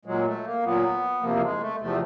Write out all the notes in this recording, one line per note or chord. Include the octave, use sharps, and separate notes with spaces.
A#2 F#3 G#3
A3
A#3
A#2 F#3 B3
E2 C3 F3 A#3
G#3
A3
E2 C3 F3 A3